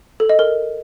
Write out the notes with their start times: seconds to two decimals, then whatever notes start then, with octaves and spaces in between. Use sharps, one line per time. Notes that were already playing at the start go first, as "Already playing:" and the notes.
0.20 A4
0.29 D#5
0.39 A#4